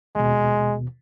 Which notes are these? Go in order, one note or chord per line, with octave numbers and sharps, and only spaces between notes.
D#2 B2 G#3